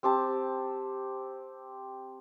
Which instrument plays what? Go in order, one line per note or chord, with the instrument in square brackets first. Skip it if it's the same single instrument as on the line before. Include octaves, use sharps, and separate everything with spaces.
[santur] C4 G4 A5